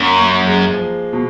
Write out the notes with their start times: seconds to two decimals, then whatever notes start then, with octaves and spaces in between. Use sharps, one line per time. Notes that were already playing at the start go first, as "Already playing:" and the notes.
Already playing: F#2 A#3
0.20 A#3
0.47 G#3
0.73 F3
1.13 B2